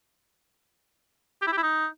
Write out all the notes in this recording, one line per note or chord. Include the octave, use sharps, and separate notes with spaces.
G4
E4
G4
E4
D#4